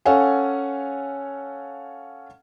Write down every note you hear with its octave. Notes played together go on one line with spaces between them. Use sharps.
C#4 A4 C#5 F5 F#5 G#5